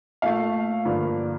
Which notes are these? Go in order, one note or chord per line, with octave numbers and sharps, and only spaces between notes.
A#2 A3 F5
G2 D3 F3 A#3